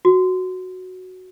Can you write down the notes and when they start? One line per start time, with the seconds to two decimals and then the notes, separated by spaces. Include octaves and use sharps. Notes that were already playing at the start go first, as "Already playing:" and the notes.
0.05 F#4